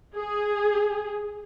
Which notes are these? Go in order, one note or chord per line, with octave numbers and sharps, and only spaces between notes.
G#4